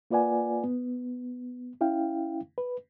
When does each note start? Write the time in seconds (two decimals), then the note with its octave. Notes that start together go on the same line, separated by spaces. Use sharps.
0.11 A#3 F4 B4 D5 F#5 G#5
0.64 B3
1.81 C#4 E4 F5 G5
2.58 B4